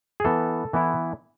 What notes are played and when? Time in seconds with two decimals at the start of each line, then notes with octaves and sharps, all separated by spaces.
0.20 G#4
0.24 E3 B3 E4 A4
0.73 E3 B3 E4